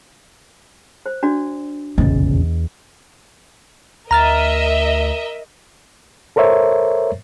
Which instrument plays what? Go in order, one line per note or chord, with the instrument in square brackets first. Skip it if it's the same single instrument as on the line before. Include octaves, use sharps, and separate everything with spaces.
[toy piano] C5
D4 F#4 D5
[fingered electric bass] F1 A#1 C#3 [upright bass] E2 [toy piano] D#5
[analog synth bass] D2 [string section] A#4 D#5 E5 [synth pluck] A#5 F6 A6
[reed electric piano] A4 A#4 C5 C#5 E5